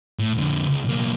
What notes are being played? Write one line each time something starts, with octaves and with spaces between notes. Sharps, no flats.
A2
F2 D3
C#2
B1 A#3